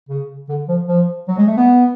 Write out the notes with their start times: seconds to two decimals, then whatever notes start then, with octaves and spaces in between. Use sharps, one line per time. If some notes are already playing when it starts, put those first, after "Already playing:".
0.09 C#3
0.49 D3
0.68 F3
0.88 F3
1.28 F#3
1.38 G#3
1.47 A3
1.57 B3